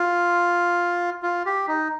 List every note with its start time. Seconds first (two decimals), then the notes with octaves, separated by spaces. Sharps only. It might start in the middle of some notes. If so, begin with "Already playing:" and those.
Already playing: F4
1.23 F4
1.46 G4
1.68 D#4